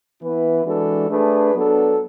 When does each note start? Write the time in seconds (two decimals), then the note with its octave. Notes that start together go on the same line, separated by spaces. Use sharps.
0.21 E3 B3 E4 B4
0.65 E3 G#3 D4 F#4 A4
1.10 A3 D4 G#4 B4
1.54 F#3 B3 D4 A4